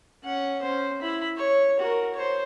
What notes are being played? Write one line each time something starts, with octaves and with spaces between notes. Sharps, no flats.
C#4 F#5
C#4 C5
E4 B5
C#5
F#4 A#4
C5 C#5